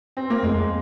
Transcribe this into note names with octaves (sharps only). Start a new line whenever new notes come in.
C4
A#3
F2 G#3